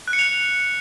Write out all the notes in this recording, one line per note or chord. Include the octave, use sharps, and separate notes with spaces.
F#6
C#7
F7